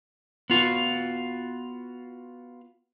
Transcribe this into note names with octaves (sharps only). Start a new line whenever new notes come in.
B3 F4 F#4